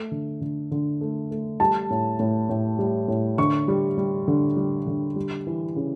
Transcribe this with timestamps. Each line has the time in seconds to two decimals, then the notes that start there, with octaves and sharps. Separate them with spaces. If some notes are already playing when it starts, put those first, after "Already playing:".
Already playing: A3
0.11 D3
0.41 D3
0.71 D3
1.01 A3
1.31 A3
1.60 G3 A5
1.90 A2
2.19 A2
2.49 A2
2.79 G3
3.08 A2
3.38 D3 C#6
3.68 G3
3.98 G3
4.28 D3
4.57 G3
4.87 D3
5.16 G3
5.47 E3
5.76 C#3